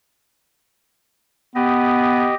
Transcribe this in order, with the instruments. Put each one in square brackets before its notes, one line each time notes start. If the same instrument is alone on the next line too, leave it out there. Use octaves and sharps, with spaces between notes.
[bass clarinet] B3 [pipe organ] G4 D#5